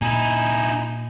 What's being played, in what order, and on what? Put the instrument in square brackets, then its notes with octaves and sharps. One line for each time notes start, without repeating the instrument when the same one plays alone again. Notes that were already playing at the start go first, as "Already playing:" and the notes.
[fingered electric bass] A#2 [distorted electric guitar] D#4 E4 [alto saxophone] G#5